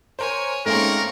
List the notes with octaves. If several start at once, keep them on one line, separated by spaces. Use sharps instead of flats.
A#4 C5 C#5 G#5
G#2 A3 A#3 C4 C#4 A#4 C#6